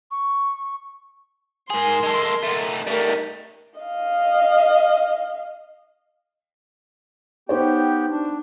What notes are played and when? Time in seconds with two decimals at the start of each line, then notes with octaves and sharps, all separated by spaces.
0.11 C#6
1.70 G#2 G#4 A#4 C6
2.03 G#3 A4
2.44 A3 D#4
2.87 G3 A3 D#4 A#4
3.80 D#5 F5
7.49 B3 D#4 G4 C5 C#5 G5
8.10 D4